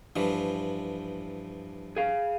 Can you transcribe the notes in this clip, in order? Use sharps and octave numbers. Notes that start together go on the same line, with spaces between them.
G2 E3 F3
G#4 F5